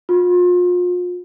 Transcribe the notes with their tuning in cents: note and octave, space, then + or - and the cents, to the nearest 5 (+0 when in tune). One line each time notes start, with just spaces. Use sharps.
F4 +35